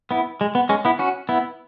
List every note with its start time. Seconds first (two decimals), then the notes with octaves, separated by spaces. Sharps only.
0.11 B3 E4
0.41 G#3
0.55 B3
0.69 G#3 C#4
0.85 B3 E4
0.99 C#4 F#4
1.29 B3 E4